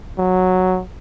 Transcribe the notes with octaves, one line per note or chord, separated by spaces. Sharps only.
F#3